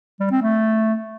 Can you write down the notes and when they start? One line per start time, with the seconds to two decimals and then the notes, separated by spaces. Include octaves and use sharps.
0.20 G3
0.31 C4
0.42 A3